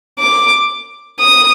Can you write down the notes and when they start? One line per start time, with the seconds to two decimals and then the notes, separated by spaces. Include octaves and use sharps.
0.20 D6
1.20 D#6